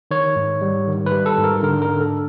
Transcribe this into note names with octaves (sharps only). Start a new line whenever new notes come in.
D#3 C#5
G#2
G3
D#3
B4
G3
A4
G#2
A#4
D3 A#4
A#4
D3
A4